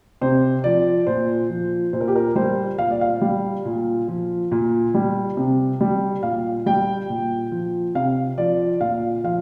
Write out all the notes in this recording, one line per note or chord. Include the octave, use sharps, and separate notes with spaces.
C3 C5
F3 D5
A#2 C5
F3
A#2 C5
A#4
G4
A#4
G3 C5
A#2 F5
D5
F5
G3
A#2
F3
A#2
G3
C3
G3
A#2 F5
G3 G5
A#2
F3
C3 F5
F3 D5
A#2 F5
F3 F5